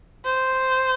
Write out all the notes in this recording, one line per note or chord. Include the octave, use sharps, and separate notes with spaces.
C5